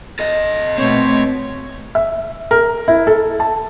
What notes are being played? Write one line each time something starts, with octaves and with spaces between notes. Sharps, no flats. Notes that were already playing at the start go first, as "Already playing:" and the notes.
A4 D#5
B2 A3 C4 C#5
E5
A#4
E4
A4
A5